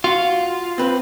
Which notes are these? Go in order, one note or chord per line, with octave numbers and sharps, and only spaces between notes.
F4 F#4
C4 B4